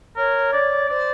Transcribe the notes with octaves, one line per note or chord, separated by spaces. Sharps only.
A#4 C#5
D5
C5 D5